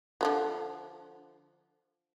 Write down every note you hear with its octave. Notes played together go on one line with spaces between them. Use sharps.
D3 F3 F#3